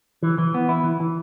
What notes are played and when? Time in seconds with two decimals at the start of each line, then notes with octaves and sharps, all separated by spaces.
0.23 E3
0.38 E3
0.54 B3
0.69 E4
0.84 E3
1.00 E3